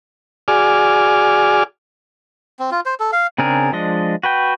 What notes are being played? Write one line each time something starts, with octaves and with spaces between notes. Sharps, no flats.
F#4 G#4 D5 G#5 D6 F6
C4
F4
C5
A4
F5
C#3 C4 D4 G#4 A#4
F3 G#3 D4 D#5
F#4 B4 G5